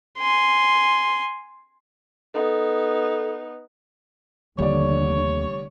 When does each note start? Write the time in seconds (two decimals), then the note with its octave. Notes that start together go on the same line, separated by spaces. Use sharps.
0.18 G#5 C6
2.34 B3 D#4 A4
4.59 F1 D#2 D3 G3 C#5 D5